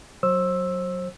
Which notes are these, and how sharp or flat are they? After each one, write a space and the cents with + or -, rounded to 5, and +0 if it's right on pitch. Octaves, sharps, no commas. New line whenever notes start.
F#3 +0 C5 +30 E6 +0